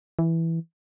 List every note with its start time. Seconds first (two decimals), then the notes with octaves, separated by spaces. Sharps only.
0.19 E3